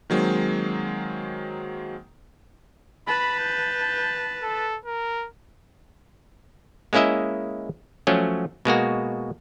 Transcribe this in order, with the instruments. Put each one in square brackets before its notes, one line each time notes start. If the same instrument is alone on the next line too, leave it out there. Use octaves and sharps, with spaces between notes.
[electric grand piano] D#3 F#3 G#3 A#3 C4
[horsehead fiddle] B4 A5 [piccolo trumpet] B5
[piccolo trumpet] G6
A4
A#4
[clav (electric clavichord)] G#3 A#3 C#4 E4 D#5 E5
F3 F#3 A3 C#4
B2 G#3 A#3 F#4